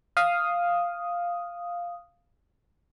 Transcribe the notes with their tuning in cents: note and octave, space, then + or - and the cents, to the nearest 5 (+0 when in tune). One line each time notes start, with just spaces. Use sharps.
F5 +0 D#6 +0